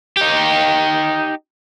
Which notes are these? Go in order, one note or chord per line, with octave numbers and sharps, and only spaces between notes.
D#4 G4